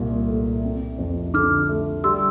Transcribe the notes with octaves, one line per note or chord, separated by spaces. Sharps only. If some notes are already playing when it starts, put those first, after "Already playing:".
Already playing: C2 A#2
A3
C4
F2
D3 D6 F6
A3
G3 C6 E6